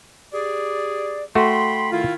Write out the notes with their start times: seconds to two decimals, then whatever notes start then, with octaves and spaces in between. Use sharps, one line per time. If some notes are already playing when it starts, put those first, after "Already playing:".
0.32 G4 G#4 D5
1.35 A3 F#4 G5 B5 C6
1.91 D#3 E4 F4